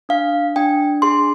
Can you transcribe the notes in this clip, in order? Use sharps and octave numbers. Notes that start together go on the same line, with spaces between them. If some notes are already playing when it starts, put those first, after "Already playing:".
D4 F5
D4 G5
G#4 C6